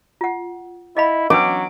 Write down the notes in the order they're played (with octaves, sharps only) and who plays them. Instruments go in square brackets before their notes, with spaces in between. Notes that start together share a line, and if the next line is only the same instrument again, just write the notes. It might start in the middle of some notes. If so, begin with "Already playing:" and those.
[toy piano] F4 F#5
[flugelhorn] E4 [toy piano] D#5 F5 B5
[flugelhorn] F#3 [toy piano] C#4 D4 B4 [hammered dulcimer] D6